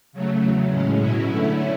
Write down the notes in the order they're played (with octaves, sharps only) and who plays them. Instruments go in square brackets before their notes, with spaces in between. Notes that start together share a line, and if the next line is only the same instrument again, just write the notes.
[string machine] C#3 F#3 A3
E2 C#3 F#3
A2 G#3 C#4
B2 F#3 C#4 E4
D3 A3 C#4 E4